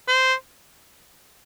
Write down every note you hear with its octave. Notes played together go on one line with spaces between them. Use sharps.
C5